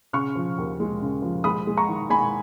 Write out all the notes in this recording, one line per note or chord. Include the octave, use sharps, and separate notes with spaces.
C#3 C#6 F6
F3
D#2
G#3
C#3
F3
G#3 B5 D#6
G#3
A#5 C#6
D#3
G#3 G#5 B5